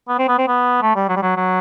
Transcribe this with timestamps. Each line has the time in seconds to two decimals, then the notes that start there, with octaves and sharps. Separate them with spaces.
0.08 B3
0.18 C4
0.28 B3
0.38 C4
0.47 B3
0.82 A3
0.95 G3
1.08 F#3
1.16 G3
1.22 F#3
1.36 F#3